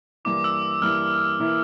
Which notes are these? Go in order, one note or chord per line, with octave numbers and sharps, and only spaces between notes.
G2 E3 A#3 E4 D6
E6
G2 E3 A#3 E4 F6
E3 A#3 E4